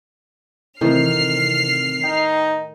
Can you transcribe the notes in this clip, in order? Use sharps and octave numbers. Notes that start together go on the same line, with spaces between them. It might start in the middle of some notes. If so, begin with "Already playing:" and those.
A2 C3 D#3 E3 C4 F6 C7
D#4 G5